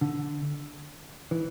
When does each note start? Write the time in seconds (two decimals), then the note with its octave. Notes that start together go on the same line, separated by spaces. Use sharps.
0.01 D3
1.31 E3